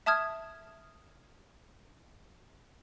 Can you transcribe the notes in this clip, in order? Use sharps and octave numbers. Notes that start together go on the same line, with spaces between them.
E5 A5 D#6 F6 G#6